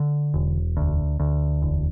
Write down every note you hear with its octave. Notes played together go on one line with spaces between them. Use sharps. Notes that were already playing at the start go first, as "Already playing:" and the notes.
Already playing: D3
E1
D2
D2
E1